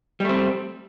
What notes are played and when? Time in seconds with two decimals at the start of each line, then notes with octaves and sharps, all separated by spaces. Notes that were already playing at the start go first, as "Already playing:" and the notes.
0.20 G3
0.25 A3
0.29 C4